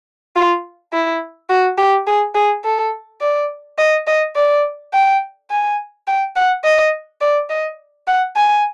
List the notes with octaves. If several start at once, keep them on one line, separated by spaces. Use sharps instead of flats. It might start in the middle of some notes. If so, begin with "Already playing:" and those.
F4
E4
F#4
G4
G#4
G#4
A4
D5
D#5
D#5
D5
G5
G#5
G5
F#5
D#5
D5
D#5
F#5
G#5